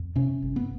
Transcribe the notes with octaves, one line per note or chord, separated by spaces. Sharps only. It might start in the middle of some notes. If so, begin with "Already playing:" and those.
Already playing: F2
C3 C#4
G1
B3